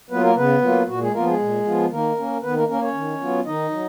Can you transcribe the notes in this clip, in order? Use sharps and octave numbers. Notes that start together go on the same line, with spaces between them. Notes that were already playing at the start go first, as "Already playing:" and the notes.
F#3 A#3 B3 F4 B4
A#3 A#4
C#3 B3 B4
F#3 A#3 F4
A#2 F#4
G#3 G#4
F3 A#3 B3 F4 A#4
G#3 G#4
A#2
F3 B3 F4
D#3 A#3 A#4
A#3 C#4
D#3 B3 B4
A#3 A#4
A#3 C#4 A#4
C#4 C#5
D#3
F#3 B3 F4
D#3 D#4 D#5
F#3